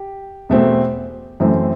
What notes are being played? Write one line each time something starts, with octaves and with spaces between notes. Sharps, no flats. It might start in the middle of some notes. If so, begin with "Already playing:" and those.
Already playing: G4
E2 B2 A3 C4
F#2 E3 A3 C4